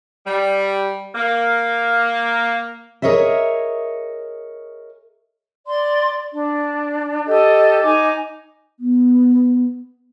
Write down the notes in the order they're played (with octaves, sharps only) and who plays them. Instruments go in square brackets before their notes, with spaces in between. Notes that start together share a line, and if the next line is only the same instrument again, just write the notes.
[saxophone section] G3
A#3
[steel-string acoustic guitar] G#4 A#4 C#5 D#5 E5
[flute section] D5 C6
D4
G4 A4 D#5
D#4 G#5 D6
[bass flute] B3